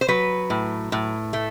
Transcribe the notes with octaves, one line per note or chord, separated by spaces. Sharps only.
C5
F#3 B4
A2
A2
A3